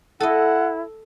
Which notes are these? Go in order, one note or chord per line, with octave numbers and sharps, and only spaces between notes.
E4 A4 D#5 F#5